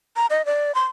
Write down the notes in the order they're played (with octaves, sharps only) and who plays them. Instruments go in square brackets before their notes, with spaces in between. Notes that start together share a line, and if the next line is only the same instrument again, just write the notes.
[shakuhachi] A#5
D#5
D5
C6